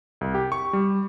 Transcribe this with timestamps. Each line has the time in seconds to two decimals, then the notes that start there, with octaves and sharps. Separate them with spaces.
0.21 C2
0.34 G4
0.52 C#6
0.73 G3